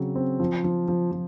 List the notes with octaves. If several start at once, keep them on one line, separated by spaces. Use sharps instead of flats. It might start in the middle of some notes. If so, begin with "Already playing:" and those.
Already playing: C#3 F#3 C4
C4
F3
F3
F3
F3